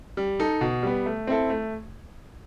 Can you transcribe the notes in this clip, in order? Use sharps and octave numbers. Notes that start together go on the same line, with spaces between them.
G3
D#4 A4
B2
G3 B3
A3
C4 E4 A4
A3